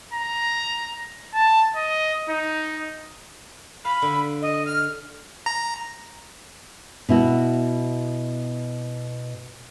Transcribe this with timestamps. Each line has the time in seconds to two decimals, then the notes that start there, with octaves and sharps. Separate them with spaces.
0.13 A#5
1.34 A5
1.76 D#5
2.29 D#4
3.85 F5 B5
4.02 D3
4.42 D#5
4.66 F6
5.46 A#5
7.09 B2 E4 F#4